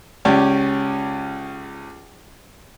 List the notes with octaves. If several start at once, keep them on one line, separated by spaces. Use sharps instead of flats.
C#2 C#4 G4 D5